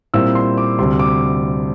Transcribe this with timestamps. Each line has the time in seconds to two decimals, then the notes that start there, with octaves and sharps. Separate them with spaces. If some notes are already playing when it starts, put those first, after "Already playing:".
0.14 A#2 G3 C4 E4 E6
0.35 C6
0.58 D6
0.79 D2 C3 G3 C6
0.99 D6